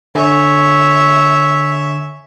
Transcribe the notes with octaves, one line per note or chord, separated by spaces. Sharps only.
D3 C#5 E5 G#5